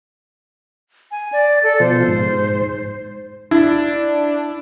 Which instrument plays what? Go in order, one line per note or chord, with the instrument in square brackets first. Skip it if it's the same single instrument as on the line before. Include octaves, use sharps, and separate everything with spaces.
[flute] G#5
D5
A4
[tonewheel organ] B2 F3 [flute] C5
[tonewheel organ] G#2
[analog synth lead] D4 [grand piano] E4